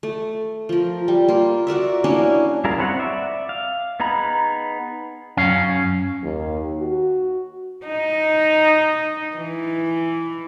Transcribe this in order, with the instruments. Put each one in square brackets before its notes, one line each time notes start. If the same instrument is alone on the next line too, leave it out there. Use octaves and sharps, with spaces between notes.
[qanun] A3
F3 A#4
G3
A#3 F4
F#4 A#4 D5 E5
A#3 C#4 D4 E4
[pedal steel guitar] G3 E4 G#4 A#4 F5
B3 C4 B4 C#5 F#5
D5 E5
F5
B3 D#4 G#4 A#5 B5
[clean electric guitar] F#2 C#4 F5
[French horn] D#2
F#4
[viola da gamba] D#4
E3